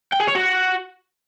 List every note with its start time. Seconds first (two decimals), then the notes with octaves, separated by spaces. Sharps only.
0.12 G5
0.20 G#4
0.27 C#5
0.35 F#4